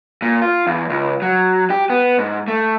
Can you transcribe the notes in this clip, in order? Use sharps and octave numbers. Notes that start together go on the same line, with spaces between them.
A#2
F4
E2
C#2
F#3
G4
B3
G#2
A3